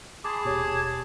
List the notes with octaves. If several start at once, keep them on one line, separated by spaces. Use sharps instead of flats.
G#4 A5 B5 C6 D6 G#6
D#1 B2 G4 C#5 D6 G#6